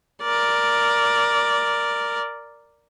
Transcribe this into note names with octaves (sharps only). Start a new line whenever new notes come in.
A#4 D5